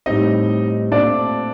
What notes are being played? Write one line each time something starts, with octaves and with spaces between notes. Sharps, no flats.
A2 G3 C4 D#4 D#5
A#2 A3 C4 D4 D5